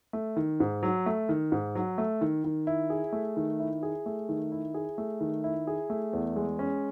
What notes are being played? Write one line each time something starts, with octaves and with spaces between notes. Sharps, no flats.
A3
D#3
G#2
F#3
A3
D#3
G#2
F#3
A3
D#3
D#3
E4
G#4
A3
D#3
E4
G#4
A3
D#3
E4
G#4
A3
D#3
E4
G#4
A3
E2
G#3
C#4